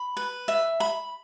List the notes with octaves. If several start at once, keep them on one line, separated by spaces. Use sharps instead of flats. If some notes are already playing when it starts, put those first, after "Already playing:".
Already playing: B5
B4
E5
B5